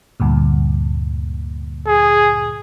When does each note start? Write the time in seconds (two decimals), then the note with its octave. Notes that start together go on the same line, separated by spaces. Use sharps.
0.20 D2 G2 A#2
1.87 G#4